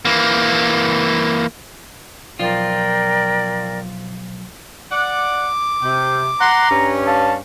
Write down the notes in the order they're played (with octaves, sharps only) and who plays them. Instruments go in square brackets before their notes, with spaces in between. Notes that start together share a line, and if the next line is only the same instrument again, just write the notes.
[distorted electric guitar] E3 A#3
[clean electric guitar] B1 F3 F4 [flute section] A#4 D5 G5
[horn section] D5 F#5 [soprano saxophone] D6
[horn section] C3 [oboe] G5
[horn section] F#5 C6 [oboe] A#5
[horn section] G2 C#4
[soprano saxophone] F5 [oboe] A5